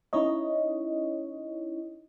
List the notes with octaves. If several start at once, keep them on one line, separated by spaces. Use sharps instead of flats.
C#4 D#4 E4 C#5 D#5